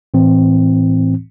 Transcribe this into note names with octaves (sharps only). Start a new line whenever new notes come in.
A2 E3 C4